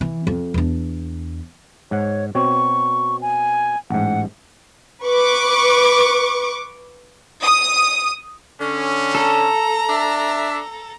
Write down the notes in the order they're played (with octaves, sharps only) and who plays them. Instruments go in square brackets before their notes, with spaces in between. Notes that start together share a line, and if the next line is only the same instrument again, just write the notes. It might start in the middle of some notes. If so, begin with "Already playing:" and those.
[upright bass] E3
F2
E2 D4
[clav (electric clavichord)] G#2 F#5 [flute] C#5
[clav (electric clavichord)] B2 C4 C#5 [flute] C#6
[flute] G#5
[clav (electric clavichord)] A1 G#2 [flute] F#5
[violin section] B4 C#6 D6
[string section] D#6
[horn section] D3 C#4
[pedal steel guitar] A4 [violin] A#5
[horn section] D4 E5